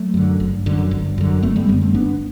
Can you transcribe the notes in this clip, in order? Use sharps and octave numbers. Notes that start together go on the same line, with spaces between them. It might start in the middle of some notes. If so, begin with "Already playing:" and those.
Already playing: F#3 A3
F#2 D3
G1
F#2 D3
G1
F#2 D3
G1 A3 C4
G3 B3
F#2 D3 G3 B3
A3 C4
G1 B3 D4